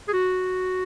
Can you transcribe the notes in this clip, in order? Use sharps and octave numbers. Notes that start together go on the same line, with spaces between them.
G#4
F#4